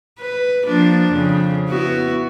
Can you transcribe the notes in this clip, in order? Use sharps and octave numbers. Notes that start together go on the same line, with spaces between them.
B4
F3 A#3 D4
F2 C#3
B3 E4 F#4